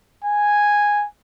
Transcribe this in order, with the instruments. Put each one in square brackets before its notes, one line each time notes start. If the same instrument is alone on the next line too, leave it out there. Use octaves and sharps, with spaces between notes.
[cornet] G#5